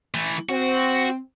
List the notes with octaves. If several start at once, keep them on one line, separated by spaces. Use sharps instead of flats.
E3 A3
C4 F#4